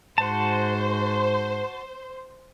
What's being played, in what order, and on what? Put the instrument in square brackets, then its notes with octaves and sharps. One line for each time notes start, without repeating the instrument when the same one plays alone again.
[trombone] G#2 [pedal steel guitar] F#4 A5 [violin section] C5